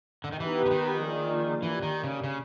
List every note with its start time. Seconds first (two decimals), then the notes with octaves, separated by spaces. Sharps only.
0.24 D3
0.32 D#3
0.40 E3 B3 D#4 G4 B4
0.66 D3
0.71 D#3
1.01 F3 A#3 D4 F4 G#4
1.63 E3 A#3 D4 G4
1.83 D#3
2.04 C#3
2.24 C#3